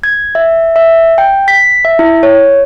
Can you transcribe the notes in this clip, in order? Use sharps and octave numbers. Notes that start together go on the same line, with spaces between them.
G#6
E5
E5
G5
B6
E5
E4
C#5